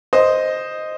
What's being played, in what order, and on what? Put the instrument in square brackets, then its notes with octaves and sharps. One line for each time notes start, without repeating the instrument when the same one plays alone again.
[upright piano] C5 D#5